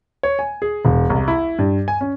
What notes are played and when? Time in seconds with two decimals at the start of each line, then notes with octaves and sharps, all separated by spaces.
0.23 C#5
0.39 G#5
0.62 G#4
0.85 E1
1.10 C2
1.28 E4
1.59 G2
1.88 G#5
2.01 C#4